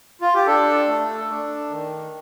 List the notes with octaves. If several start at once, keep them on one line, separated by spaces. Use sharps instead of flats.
F4
G4
D4 A4
A3
D4
D#3